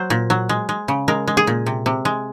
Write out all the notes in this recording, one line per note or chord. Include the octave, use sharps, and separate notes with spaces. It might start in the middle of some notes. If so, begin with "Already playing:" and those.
Already playing: F#3 C5
A#2
F#3
G#3
G#3
C#3
G#3 A#4
G#3
G#4
A#2
C3
C3
G#3